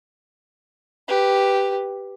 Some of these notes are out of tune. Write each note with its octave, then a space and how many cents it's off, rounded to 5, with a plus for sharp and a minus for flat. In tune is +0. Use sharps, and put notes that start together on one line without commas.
G4 +0 B4 +0